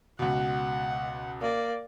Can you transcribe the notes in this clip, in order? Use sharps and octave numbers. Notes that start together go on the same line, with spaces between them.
C#2 B2 F#5
A#3 D5